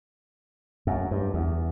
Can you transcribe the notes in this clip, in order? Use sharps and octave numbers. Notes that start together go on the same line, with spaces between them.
F#2
G2
E2